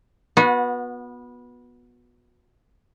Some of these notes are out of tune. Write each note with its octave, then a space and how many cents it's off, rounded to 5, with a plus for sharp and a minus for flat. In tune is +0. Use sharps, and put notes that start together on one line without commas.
B3 -15 F#4 -35